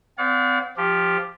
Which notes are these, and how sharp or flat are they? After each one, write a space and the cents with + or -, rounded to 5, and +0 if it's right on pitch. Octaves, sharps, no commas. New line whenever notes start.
C4 -40 D5 -40 F5 +45
F3 +0 G4 +5